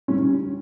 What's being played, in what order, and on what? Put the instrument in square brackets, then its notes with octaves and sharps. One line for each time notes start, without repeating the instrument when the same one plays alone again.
[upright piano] D3 G3 C#4